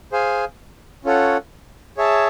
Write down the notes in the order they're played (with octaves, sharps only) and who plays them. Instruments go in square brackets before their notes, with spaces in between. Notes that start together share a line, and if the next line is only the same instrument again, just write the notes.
[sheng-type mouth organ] G#4 C5 F5 G#5
C#4 F4 A4 C#5 F#5
G#4 C#5 E5 A5